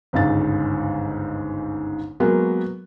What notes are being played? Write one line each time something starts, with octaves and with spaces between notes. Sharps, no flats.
G1 C#2 G#2 A6
F#3 G#3 A#3 B3 F#4